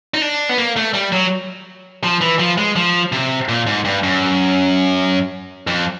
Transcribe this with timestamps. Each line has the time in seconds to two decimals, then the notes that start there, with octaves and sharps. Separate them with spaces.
0.14 D#4
0.22 D4
0.49 B3
0.58 A#3
0.76 A3
0.94 G3
1.12 F#3
2.03 F3
2.21 E3
2.39 F3
2.58 G#3
2.76 F3
3.12 C3
3.49 A#2
3.67 G#2
3.85 G2
4.03 F#2
5.67 F2